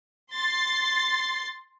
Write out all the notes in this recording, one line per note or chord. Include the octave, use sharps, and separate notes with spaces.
C6 A6 C7